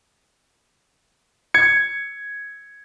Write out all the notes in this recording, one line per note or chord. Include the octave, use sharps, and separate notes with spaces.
G#6 C#7